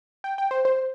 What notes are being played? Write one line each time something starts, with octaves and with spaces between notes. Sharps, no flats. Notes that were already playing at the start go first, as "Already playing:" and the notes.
G5
G5
C5
C5